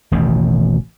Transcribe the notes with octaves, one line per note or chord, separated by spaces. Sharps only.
E1 A1 B2 D#3